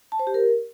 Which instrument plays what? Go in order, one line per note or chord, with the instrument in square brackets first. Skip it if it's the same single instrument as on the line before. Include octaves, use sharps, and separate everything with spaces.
[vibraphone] A5
C5
G4
A#4